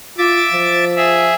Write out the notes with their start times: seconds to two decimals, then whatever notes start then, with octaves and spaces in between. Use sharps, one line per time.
0.18 F4 E5 D6 A6
0.53 F3
0.96 G#4 E5